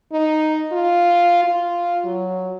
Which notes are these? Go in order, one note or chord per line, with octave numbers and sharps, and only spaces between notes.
D#4
F4
F4
F#3